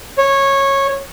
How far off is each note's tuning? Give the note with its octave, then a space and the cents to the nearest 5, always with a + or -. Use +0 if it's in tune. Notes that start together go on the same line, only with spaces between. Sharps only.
C#5 -15